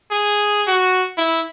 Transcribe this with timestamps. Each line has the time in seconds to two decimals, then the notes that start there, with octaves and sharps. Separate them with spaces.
0.12 G#4
0.68 F#4
1.18 E4